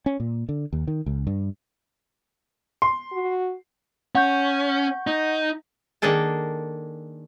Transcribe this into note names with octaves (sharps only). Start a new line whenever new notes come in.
C#4
A#2
D3
D#2
D#3
C#2
G2
C6
F#4
C#4 F#5 C#6 G6
D#4
D#3 A#3 D4 G#4 A4 A5